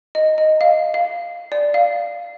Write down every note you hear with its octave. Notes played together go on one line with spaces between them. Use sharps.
D#5
D#5
F5
F5
D5
F5